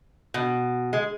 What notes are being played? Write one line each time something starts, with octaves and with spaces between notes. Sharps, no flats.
B2
G#3